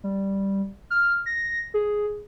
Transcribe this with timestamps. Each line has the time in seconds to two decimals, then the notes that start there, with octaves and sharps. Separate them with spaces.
0.04 G3
0.90 F6
1.26 A#6
1.74 G#4